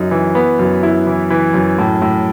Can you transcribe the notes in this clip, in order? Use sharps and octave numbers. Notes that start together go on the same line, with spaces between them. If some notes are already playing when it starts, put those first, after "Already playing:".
Already playing: F#2 D#4
E3
B3
F#2
E4
E3
E3
F#2
A2
A2